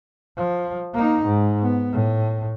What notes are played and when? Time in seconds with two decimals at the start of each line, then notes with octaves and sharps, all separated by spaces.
0.37 F3
0.94 A#3 D#4
1.25 G#2
1.62 B3
1.93 A2